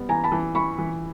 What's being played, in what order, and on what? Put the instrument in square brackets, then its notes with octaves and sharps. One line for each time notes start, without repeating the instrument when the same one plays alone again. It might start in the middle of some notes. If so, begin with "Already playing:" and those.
Already playing: [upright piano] G3 B3
[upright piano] E3 [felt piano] G#5 A#5
[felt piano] A5 B5
[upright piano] E3
[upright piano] E3 [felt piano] B5 C#6
[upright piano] E3